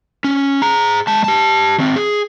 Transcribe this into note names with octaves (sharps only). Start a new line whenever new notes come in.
C#4
G#4 A#5
G#3 A5
G4 A5
D#3 C4
G#4